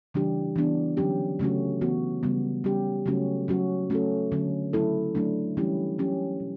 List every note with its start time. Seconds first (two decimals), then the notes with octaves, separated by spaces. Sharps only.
0.14 C#3 E3 G3 D4 G4
0.56 E3 B3 D4
0.97 D3 F#3 C#4 G4
1.39 C#3 F#3 A3 C#4 F#4
1.81 E3 B3 F#4
2.23 C#3 G3 B3
2.64 G3 C#4 G4
3.06 C#3 F#3 A3 C#4 F#4
3.48 F#3 C#4 F#4
3.90 A3 C#4 F#4 A4
4.32 D3 F#3 C#4
4.73 C#3 F#3 A3 E4 A4
5.15 F#3 A3 D4
5.57 E3 G3 C#4 E4 G4
5.99 F#3 C#4 G4
6.40 B2